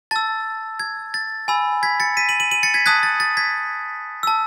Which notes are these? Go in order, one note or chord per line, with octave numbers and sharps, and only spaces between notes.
A5 E6 A6
G#6
A6
G#5 B5 E6
G#6 B6
A6 C#7
B6 D#7
D#7 F#7
D#7 F#7
D#7 F#7
A6 C#7
G#6 B6
A5 D#6 F#6 G#6 B6
A6
A6
G#6 B6
A5 E6